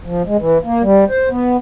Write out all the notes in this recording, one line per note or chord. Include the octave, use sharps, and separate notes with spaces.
F3
G#3
E3
A#3
G3
C5
B3